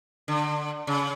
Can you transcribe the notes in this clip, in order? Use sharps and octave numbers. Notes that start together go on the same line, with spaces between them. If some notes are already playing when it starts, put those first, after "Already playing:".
D3
C#3